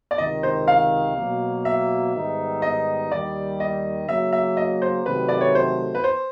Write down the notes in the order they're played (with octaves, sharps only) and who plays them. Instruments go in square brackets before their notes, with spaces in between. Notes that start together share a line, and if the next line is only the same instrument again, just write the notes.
[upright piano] D5
[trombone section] C#2 C3 D#3 [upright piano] D#5
[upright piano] C5
F5
[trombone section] B2 F#3 A#3
[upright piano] E5
[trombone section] G#2 D#3 G3 B3 D#4
[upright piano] D#5
[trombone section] D#2 D#3 G3 [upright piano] D5
[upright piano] D#5
[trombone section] C#3 F#3 A#3 [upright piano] E5
[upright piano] E5
D#5
C5
[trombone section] C3 D#3 F#3 A3 [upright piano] B4
[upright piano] D5
C#5
C5
B4
C5